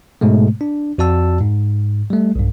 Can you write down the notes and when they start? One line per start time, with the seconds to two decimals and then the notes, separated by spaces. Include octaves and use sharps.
0.21 G#2 B2 G#3 A3
0.61 D4
0.98 F2 F#4 D5 A5 E6
1.40 G#2
2.10 G3 A3
2.35 B1 G2